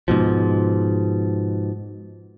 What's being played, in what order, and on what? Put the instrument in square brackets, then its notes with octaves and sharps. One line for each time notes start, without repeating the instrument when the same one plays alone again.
[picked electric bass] G#2 B2 F3